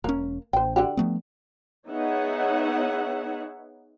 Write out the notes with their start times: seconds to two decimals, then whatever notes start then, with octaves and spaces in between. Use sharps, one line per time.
0.04 E1 A#3 C#4 A#4
0.53 A1 C5 G5
0.76 D3 F#4 G4
0.97 F3 A3 B3
1.88 B3 D#4 G#4 C#5 E5 F#5